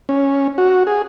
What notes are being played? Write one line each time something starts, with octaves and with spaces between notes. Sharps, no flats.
C#4
F#4
G#4